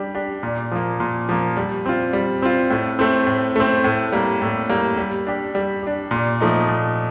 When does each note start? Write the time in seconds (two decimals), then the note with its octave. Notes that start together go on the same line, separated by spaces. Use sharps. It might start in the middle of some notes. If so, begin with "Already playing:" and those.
Already playing: G3 D4 G4
0.15 D4 G4
0.43 A#2
0.72 F3 A#3
1.00 A#2
1.29 F3 A#3
1.57 G3
1.86 C4 F4
2.13 G3
2.42 C4 F4
2.70 A2
2.99 A3 C4
3.27 A2
3.56 A3 C4
3.84 A2
4.12 G3 A#3
4.42 A2
4.70 G3 A#3
4.97 G3
5.27 D4 G4
5.55 G3
5.83 D4 G4
6.11 A#2
6.41 F3 A3 D#4
6.69 A#2